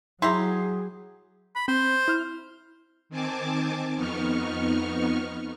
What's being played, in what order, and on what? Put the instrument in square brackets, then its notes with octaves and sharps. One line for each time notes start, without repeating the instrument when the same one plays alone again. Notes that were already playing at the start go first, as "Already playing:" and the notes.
[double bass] F#3 [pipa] E4 G4 A#5 [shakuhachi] G#4 [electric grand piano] C6
[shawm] B5
[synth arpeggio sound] C4 [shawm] C5
[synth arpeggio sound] E4 F6
[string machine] D#3 C4 G#5 A5 D6
F2 B3 D#4 C#6 F6